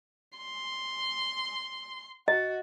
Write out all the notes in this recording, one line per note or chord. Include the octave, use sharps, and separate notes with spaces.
C6
F#4 D#5